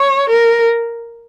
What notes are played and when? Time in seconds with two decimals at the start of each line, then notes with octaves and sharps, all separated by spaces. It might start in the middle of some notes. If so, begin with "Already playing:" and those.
Already playing: C#5
0.30 A#4